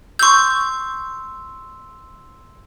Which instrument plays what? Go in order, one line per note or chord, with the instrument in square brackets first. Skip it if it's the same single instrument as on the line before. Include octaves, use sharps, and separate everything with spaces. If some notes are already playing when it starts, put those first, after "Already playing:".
[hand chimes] C6 E6 [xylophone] C#6 G6